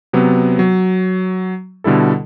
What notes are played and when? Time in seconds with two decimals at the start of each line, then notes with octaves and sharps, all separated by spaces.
0.13 C3 F#3 B3
0.59 F#3
1.84 B2 D3 G3 E4 A4